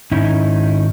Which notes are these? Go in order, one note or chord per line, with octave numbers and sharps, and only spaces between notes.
G#2 D#3 C#4 D#4 E4